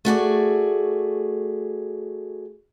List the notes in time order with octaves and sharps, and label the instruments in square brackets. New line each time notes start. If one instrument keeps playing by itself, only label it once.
[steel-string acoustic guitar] A3 F#4 G#4 D5